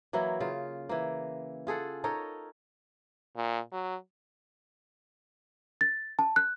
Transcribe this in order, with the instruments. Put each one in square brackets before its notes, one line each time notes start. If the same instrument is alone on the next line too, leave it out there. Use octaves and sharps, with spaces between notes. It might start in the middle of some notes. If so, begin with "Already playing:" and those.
[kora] E3 F#3 A#3 E4
C#3 F4
E3 A#3
F4 G#4 A4 F#5
D#4 A4 A#4 C#5
[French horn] A#2
F#3
[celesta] A6
A5
F#6